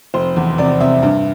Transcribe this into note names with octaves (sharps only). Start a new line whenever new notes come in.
F1 C5
E2
C3 D5
C3 E5
G2